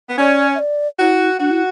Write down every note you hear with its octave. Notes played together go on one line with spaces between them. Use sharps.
B3
C#4 D5
E5
D5
E4 F#4
D4 F#4
E4